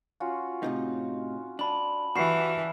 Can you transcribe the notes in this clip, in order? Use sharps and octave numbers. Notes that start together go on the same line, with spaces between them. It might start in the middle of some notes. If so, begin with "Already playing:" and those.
C#4 F4 F#4
A2 C3 D#4
D4 A5 B5 F#7
E3 G3 F#4 C#6 F6 C7 E7